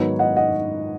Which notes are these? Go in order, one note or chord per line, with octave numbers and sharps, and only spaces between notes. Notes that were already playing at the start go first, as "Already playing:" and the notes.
Already playing: G#2 D#3 F#3 B3 D#4 C#5
D#5 F#5
D#5 F#5